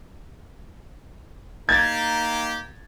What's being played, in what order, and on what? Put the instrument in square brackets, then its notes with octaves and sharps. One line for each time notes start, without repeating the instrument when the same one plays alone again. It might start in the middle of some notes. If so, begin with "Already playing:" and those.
[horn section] A#3 D#4 G4 [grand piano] G#6 A6